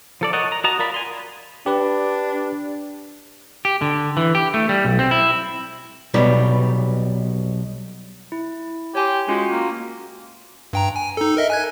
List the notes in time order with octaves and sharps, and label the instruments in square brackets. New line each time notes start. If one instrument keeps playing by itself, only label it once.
[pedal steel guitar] F3 A4 D5
A#4 C#5 D#5 F#5 A5
A#5
F#4 D#5 A5 A#5
F4 A#4 D5 B5
G#5 C6
[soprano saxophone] D4 [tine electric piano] G4 B4
[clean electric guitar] G4
D3
E3
G4
A3
G3
B1
C4
E4
[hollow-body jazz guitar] B1 B2 G3 D#4
[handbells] E4
[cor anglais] G4 [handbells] C#5 G#5 C6
[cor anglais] G#3 [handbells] C#4 F4 F#4
[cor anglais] A#3
[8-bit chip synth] G2 G5 A#5
G#5
D#4 A4
A#4 D#5 E5
G#5 F#6 G#6